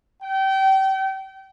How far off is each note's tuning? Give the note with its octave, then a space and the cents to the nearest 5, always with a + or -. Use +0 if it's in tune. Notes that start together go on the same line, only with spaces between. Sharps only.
G5 -30